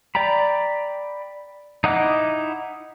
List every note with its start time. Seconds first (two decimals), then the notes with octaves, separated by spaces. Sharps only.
0.15 D5 G5 A#5 B5
1.84 D#4 E4 D#5 F#5 D6